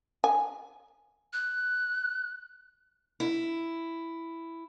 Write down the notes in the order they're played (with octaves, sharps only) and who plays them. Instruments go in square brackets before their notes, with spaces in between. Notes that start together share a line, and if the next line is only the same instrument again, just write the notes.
[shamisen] G#5
[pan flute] F#6
[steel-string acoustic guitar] E4